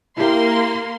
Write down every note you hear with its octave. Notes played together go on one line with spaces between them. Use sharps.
A#3 E4 G4 C6